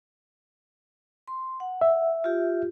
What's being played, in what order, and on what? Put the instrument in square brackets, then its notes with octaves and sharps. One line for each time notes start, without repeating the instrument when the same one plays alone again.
[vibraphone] C6
F#5
[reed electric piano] E5
[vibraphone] F4 G4